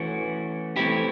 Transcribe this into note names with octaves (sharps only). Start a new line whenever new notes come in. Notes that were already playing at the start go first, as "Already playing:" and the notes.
Already playing: E3 A3 C#4 F#4
E3 A3 C4 E4 G4